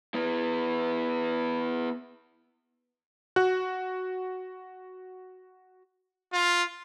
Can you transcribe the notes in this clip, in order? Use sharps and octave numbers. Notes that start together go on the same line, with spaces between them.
B3 E4
F#4 F#6
F4